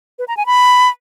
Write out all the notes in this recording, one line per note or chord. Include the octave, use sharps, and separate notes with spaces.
B4
A#5
G#5
B5